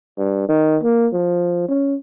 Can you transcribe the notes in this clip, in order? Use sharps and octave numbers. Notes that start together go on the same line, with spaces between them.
G2
D#3
A#3
F3
C#4